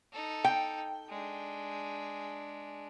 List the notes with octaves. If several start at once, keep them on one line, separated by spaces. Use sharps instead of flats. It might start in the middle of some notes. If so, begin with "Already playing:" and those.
D#4 A4
G5
G#3 D4